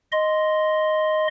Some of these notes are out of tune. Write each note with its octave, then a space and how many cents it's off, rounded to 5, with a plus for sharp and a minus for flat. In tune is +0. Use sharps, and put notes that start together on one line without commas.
D#5 +0 C6 +0